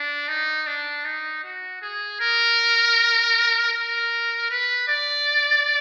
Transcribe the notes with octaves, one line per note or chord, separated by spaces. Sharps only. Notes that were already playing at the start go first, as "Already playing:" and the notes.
Already playing: D4
D#4
D4
D#4
F#4
G#4
A#4
A#4
B4
D5